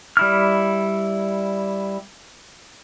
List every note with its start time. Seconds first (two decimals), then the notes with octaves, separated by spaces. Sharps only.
0.17 G3 E4 F6